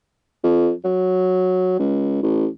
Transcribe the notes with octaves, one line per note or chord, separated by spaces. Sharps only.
F2
F#3
C#2
A1